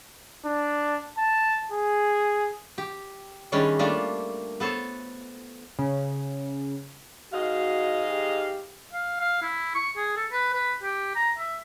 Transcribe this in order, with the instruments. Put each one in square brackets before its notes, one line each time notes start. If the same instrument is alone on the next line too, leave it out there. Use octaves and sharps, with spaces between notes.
[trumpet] D4
A5
G#4
[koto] G4
D#3 G3 G#3 C#4 D4 E4
G3 A3 A#3 D4 F4
B3 A4 C5 C#5
[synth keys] C#3
[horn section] G#2 D#5 F5 [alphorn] F#4
[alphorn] G4
[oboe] F5
F5
E4
C#6
G#4
A4
B4
B4
G4
A#5
E5